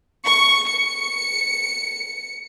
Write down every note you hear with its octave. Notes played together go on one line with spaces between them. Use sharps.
C#6
C#7